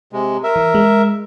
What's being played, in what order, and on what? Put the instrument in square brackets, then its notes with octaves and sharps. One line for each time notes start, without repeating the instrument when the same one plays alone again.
[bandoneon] C3 G#3
A#4 E5
[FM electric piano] E3
G#3